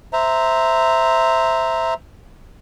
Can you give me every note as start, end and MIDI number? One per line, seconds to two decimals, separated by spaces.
0.13 1.94 72
0.13 1.94 76
0.13 1.94 82